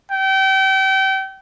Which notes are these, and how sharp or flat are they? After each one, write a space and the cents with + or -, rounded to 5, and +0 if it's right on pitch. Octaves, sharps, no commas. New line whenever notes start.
G5 -30